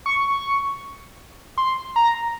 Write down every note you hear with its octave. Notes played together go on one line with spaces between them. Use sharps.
C#6
C6
A#5